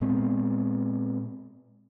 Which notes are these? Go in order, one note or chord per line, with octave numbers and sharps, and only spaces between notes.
A#2 G#3 B3 C4